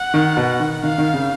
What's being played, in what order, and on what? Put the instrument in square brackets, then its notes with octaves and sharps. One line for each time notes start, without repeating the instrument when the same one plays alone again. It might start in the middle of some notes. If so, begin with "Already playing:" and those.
Already playing: [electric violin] F#5
[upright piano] D#3
B2
D#3
[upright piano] D#3 [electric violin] F5
[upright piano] D#3
C#3